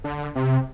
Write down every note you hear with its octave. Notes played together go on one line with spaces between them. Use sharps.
D3
C3